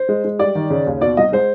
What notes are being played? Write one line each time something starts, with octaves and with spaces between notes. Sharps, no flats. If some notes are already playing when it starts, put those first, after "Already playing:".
Already playing: C5
G#3
G#3
G3 D5
D#3
C#3
D#2
B2 D5
C2 D#5
G#3 C5